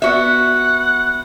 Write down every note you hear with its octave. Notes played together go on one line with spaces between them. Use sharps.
B3 F#4 E5 F#5